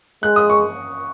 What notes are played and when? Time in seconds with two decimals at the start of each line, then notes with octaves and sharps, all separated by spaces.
0.23 G#3 F#6
0.36 D#6
0.50 C#6